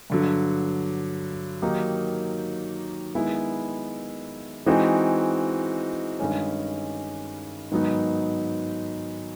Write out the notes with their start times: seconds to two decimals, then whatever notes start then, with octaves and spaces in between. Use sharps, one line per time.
0.10 G2 D3 F#3
1.62 D#3 F#3 A#3 D#4 G4
3.15 D#3 G#3 B3 E4
4.66 E3 G#3 C4 D#4 F#4
6.19 G2 D#3 G#3 C#4
7.71 G#2 D#3 F#3 B3 D#4